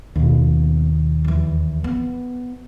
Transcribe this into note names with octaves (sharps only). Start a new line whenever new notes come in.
D#2 B2
E2 E3
B3